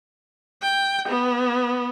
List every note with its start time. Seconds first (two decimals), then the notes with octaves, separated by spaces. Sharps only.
0.63 G5
1.08 B3